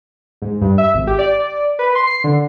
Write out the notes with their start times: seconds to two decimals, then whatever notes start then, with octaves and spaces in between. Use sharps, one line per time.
0.42 G#2
0.61 G2
0.78 E5
0.94 G#1
1.07 G4
1.19 D5
1.79 B4
1.95 C6
2.07 C7
2.24 D3